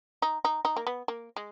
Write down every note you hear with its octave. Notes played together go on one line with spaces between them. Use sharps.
D#4
D#4
D#4
A#3
B3
A#3
G#3